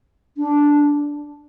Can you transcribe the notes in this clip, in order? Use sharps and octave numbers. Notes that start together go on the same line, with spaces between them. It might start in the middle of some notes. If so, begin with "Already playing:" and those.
D4